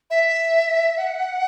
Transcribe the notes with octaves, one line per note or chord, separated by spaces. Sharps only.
E5
F#5